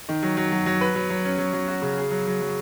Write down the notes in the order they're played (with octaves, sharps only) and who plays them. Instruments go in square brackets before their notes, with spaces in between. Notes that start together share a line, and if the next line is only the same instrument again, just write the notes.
[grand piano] D#3
F#3
F#3
F#3
F#3
B4
F#3
F#3
C#4
F#3
F#3
F#4
C#3
G#4
F#3
F#3
F#3